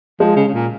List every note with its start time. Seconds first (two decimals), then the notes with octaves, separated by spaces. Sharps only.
0.20 F3 G#3
0.36 C#3
0.48 C#3
0.54 A#2